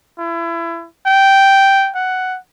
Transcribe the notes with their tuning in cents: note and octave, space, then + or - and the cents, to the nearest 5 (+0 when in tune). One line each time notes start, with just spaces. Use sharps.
E4 +30
G5 -5
F#5 +5